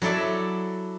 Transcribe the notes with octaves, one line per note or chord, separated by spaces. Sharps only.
F#3 E4 A4 D5 E5